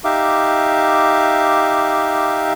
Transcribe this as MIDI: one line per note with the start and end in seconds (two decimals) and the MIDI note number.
0.04 2.53 63
0.04 2.53 67
0.04 2.53 76
0.04 2.53 77
0.04 2.53 86